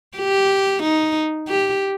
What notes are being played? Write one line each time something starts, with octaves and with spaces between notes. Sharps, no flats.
G4
D#4
G4